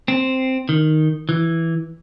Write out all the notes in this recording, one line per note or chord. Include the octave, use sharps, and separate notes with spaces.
C4
D#3
E3